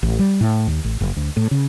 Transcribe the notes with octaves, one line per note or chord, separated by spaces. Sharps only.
A1
G3
A2
D#2
A1
F#1
D2
A2
C#3